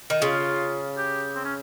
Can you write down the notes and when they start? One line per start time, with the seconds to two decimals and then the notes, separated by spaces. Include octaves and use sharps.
0.10 D#3
0.22 C#3 F4
0.98 G4
1.35 C4
1.45 C#4